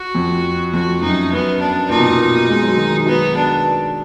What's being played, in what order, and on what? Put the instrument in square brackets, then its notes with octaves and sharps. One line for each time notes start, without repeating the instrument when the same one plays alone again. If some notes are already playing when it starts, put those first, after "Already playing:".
Already playing: [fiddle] F#4
[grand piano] F2
[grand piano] F2 [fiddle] F#4
[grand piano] F#2 [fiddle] D#4
[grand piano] F#2 [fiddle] B3
[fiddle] D4
[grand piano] A#2 [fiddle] D#4
[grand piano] B2
A#2
G#3
F#3
D#3
F#3
[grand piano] F#3 [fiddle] B3
[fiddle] D4